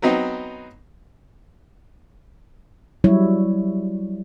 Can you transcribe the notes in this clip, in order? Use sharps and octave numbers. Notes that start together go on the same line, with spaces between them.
F#3 B3 C4 D#4
F#3 G3 E4 C#5